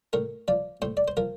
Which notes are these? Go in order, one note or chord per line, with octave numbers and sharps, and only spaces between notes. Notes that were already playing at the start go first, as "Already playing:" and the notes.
A2 A#4
F3 D5
A2 C5
D5
C5
F3 A#4